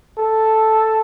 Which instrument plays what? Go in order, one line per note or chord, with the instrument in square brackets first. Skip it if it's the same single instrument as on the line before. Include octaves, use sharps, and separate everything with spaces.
[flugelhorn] A4